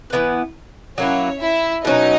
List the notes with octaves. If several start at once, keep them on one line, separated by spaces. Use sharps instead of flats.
E3 B3 E4 B4
F#3 A#3 C#4 E4 C#5
E4 E5
B2 F#3 C#4 D#4 D#5